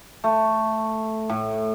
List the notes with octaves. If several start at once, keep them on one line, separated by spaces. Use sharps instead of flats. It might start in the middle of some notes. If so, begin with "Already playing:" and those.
A3
A2